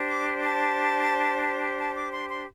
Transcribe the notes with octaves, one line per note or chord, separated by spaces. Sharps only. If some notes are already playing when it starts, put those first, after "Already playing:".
Already playing: D4 G4 C5
D6
A5
A5
D6
C6
C6